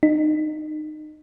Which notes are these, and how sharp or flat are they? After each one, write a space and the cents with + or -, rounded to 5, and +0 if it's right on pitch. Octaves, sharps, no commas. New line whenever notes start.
D#4 -25